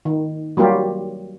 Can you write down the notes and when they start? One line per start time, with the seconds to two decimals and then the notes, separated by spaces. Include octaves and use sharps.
0.05 D#3
0.57 F#3 G3 A#3 F4 G4